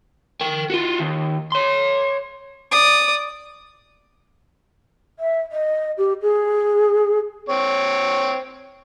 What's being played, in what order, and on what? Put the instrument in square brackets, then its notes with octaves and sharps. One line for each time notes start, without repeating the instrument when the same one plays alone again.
[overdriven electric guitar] A#4 G5
F4 F#4
D#2
C#5 C6
[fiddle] D5 D#6
[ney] E5
D#5
G4
G#4
[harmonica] C4 C#5